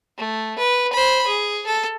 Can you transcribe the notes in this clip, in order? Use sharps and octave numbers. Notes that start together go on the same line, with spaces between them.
A3
B4
C5 B5
G#4
A4